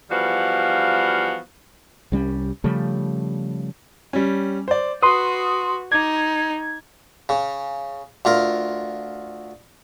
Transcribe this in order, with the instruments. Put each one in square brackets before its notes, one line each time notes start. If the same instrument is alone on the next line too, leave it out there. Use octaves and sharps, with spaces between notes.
[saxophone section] E3 F3 G3 B3 F#4 F5
[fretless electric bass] C2 G3 C#4
C#3 F3 G3 A3
[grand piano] G3 C#4
C5 D5
[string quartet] F#4 [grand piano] B4 [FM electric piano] C6 D#6
[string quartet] D#4 [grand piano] D6 [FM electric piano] G#6
[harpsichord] C#3
D2 F4 A#4